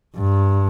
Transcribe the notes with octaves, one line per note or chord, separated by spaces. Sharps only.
G2